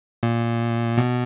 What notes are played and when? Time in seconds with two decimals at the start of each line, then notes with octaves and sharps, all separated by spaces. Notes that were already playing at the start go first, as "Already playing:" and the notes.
0.23 A#2
0.97 B2